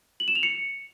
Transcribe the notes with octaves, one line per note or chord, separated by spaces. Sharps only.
F#7
E7
F7
C#7